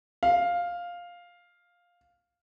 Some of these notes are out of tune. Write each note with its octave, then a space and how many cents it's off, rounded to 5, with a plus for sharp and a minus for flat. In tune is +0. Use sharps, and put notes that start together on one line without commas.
F5 +5